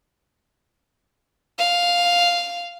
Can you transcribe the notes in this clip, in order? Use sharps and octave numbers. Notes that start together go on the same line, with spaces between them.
F5